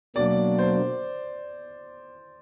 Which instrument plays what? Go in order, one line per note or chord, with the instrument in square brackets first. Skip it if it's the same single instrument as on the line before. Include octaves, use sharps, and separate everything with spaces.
[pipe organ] B2 F#3 A#3 D4 [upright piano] D5
[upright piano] C5